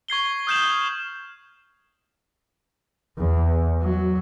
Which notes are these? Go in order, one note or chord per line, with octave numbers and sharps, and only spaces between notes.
C#6 G#6 C7 G7
D#6 F6 G6 C7 E7 F#7
E2
F#3